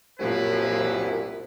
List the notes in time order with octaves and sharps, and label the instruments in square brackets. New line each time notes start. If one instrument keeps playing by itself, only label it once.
[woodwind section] C2 F#2 [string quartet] A#2 F3 [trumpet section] E4 B4